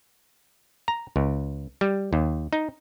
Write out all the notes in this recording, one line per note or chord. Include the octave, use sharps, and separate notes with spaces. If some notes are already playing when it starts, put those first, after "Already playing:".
A#5
C#2
G3
D#2
D#4